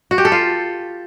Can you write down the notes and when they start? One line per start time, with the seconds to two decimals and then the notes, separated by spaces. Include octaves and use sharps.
0.11 F#4
0.18 G4
0.25 A4
0.32 F4